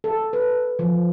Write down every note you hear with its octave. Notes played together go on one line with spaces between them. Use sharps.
A4
B4
F3